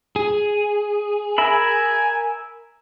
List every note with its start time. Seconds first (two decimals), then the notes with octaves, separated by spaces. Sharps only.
0.16 G#4
1.38 A#4 E5 G#5 B5